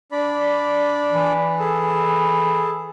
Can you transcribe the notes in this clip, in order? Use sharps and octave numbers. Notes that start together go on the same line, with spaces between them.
D4 D5 B5
E3
G#4 A4